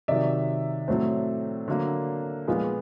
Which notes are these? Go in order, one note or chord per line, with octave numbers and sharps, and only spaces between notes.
C3 D#3 F#3 D5 E5
A2 F#3 A3 C4
D3 F#3 A#3
A#2 F3 G#3 B3